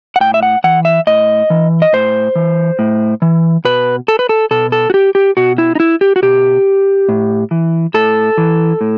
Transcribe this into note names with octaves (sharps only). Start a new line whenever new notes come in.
F#5
A2 G5
E5
F#5
E3 F#5
E5
A2 D#5
E3
D#5
A2 C5
E3
A2
E3
B2 B4
A4
B4
A4
B2 A4
A4
F#4
G4
G4
B2 F#4
E4
D#4
E4
G4
F#4
B2 G4
A2
E3
A2 A4
E3
A2